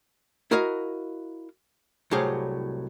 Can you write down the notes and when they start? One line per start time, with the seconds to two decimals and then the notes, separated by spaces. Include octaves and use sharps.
0.51 E4 F#4 A#4 D#5 F5
2.11 C2 A2 F#3 G4 G#4 F5